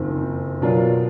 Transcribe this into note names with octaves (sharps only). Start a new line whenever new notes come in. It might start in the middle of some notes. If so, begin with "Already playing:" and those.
Already playing: F#1 F2 D#3
B2 F#3 D4 F4 A#4